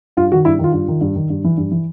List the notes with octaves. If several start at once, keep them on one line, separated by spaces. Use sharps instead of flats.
G2 F4
D#3 F#4
G2 E4
D#3 F4
G2 F4
D#3
G2
D#3
G2
E3
G2
E3